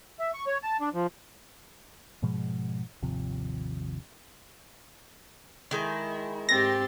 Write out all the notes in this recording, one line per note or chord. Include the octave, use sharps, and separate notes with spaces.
E5
C#6
C#5
A5
D4
F3
G#2 B2 F3 G#3
G#1 D#2 C3 F3
D#3 G#3 E4 G#5
G#2 C4 G4 C6 A6 A#6